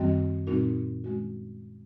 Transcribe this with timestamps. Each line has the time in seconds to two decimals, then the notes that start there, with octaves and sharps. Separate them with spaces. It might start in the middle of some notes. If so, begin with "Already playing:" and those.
Already playing: F#2 D#3 G3 C4
0.47 A#2 G3 C4 D#4 F#4
1.04 D#3 G#3 C#4 F#4